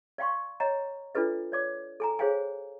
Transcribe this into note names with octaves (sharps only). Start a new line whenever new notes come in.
D5 F5 G5 C6 C#6
C#5 D#5 G5 A#5
D4 F4 A4 B4 D#5
C#5 D5 D6
A4 G#5 A#5
G#4 C5 C#5 F5 G5 G#5